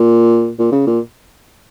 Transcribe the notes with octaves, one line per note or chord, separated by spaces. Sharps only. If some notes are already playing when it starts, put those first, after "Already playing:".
Already playing: A#2
A#2
C#3
A#2